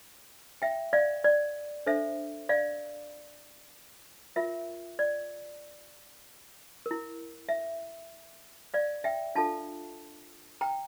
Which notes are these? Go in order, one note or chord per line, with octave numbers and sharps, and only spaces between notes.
E5 G5
D5 F5
D5
D4 A4 C5 E5
D5 F5
F4 A#4 E5
D5
A#4
E4
E5
D5 F5
E5 G5
D4 F4 A4 F5 A5
G5 A#5